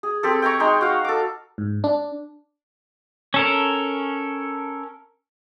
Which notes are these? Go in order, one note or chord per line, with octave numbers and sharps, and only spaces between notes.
G#4
C4 G4 A4
G5 G#5 A#5 C#6
G#3 D#4 G5
F#4 F5
A4 D6
G#2
D4
C#4 A4 A#4